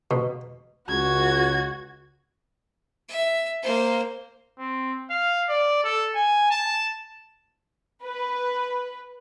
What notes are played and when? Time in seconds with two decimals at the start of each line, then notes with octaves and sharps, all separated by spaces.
0.11 B2
0.89 C#2 F#4 G#6
3.09 E5
3.63 A#3 C5
4.58 C4
5.10 F5
5.48 D5
5.84 A4
6.15 G#5
6.51 A5
8.04 B4